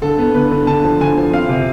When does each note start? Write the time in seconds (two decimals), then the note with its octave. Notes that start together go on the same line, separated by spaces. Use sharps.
0.02 D3 A4
0.19 B3
0.34 D3 B4
0.51 D3
0.67 D3 A5
0.84 F3
1.01 D3 G#5
1.18 F3
1.33 C4 F5
1.49 C3